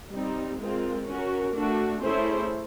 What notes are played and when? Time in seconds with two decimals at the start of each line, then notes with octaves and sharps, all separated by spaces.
0.12 G3 C4 D#4
0.59 G#3 C4 F4 A#4
1.07 C#4 F#4 A#4
1.54 A3 D4 F#4
2.02 A3 C#4 E4 G#4 C5